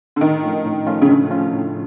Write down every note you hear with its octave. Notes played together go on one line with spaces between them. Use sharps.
D3
A2 D#3
F3 A3 C#4 F4
A2
F3 A3 C#4 F4
C#3
A2 D3
F3 A3 C#4 F4
A2